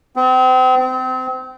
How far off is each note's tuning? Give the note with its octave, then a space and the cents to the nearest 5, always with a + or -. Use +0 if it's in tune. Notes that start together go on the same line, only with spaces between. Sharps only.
C4 -35
C4 -30